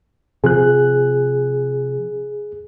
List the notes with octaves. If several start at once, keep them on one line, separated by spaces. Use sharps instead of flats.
C3 F3 G#4 F#6